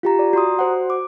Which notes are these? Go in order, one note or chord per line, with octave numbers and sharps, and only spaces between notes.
F4 G4 A#5
D5
F#4 A#5 C6 D#6
F#4 C5 F#5
D6